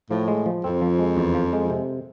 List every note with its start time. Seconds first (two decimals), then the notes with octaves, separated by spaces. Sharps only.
0.10 A2 F3
0.28 G#3
0.46 F3
0.64 F2 C4
0.82 F3
0.99 G#3
1.17 E2
1.34 F3
1.53 G#3
1.70 C3